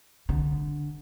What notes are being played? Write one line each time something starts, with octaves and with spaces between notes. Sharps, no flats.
D3